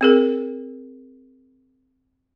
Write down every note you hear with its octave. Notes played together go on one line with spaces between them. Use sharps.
C4 G#4 A#4